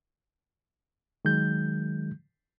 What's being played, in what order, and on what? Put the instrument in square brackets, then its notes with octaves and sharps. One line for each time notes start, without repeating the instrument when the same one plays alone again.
[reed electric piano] D#3 F#3 G#3 G6